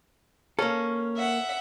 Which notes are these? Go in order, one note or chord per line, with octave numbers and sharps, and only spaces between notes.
A#3 C#4 A4
E5 F#5